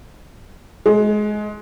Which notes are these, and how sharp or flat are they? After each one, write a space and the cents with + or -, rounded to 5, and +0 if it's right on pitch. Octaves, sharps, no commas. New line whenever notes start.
G#3 +20